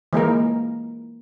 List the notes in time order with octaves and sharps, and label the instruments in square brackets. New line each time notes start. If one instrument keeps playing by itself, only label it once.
[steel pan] E3 G#3 A#3 A#4